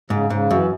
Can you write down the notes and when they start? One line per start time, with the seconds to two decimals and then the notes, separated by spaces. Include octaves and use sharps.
0.10 G#2 C#3
0.30 G#2 C#3
0.50 F#2 E3